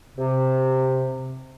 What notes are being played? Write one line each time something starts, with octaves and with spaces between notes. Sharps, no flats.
C3